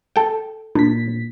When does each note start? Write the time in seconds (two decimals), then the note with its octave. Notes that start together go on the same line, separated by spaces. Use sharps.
0.16 A4 G5
0.75 A#2 D4 B6